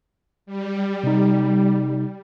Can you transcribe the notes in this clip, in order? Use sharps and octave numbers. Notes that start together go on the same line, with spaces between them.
G3
C3 D#4